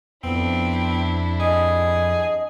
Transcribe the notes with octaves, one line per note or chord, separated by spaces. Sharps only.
F2 B3 C4 D4 E4
G#4 D#5